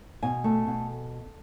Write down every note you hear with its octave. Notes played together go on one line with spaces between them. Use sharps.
B2 G#5
A3
B2